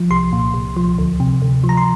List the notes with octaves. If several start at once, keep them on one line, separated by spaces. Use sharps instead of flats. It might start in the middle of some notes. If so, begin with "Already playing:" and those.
Already playing: F3
C2 C6
A#2
C2
F3
D2
C3
D2
F3
A#5
C6